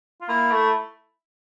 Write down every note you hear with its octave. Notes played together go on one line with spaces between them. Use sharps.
F4
A#3 E4
A3